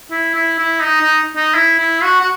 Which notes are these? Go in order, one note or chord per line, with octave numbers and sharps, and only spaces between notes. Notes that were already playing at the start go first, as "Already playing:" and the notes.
E4
E4
E4
D#4
D#4
D#4
E4
E4
F#4
F#4